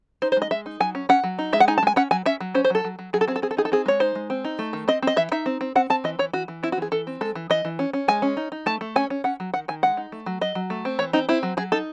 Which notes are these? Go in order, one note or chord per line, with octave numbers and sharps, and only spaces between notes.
D#4 C5
C5
G#3 D#5
G#3 E5
D#4
F#3 G#5
C#4
C#4 F#5
F#3
D#4
G#3 E5
F#5
D#4 G#5
A5
G#3 G#5
C#4 F#5
F#3 G#5
C#4 E5
F#3
C#4 C5
C5
F#3 A4
F#3
F#3
F#3 G#4
A4
C4 G#4
A4
C4 G#4
A4
D#4 G#4
A4
C4 G#4
G#3 C#5
D#4 C5
G#3
C4
D#4
A3
D#3
C4 D#5
C4 D#5
E3 E5
D#4 E5
C4
C4
C4 F#5
C4 A5
E3 D#5
E3 C#5
E3 F#4
E3
C4 E4
F#4
E3 G#4
E3 A4
C4
G#3 A4
E3
E3 D#5
E3
C#4
C#4
G#3 G#5
C#4
D#4
D#4
A3 A5
A3
C#4 G#5
C#4
C#4 F#5
F#3
D#3 F#5
D#3 G#5
G#3 F#5
D#4
A3
F#3
F#3 D#5
F#3
A3
C4
E3 C#5
C4 D#4
C4 E4
F#3
F#3 G#4
D#4 A4